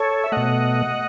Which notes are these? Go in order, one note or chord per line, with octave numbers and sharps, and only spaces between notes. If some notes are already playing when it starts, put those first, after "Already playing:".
Already playing: A4 C#5
E5
B2 A3 D#5 F#5